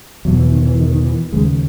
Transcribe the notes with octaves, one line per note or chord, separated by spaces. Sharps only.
E2 B2 F#3
E3
D#3
E3
D#3
D#3
E3
D#2 C#3 G#3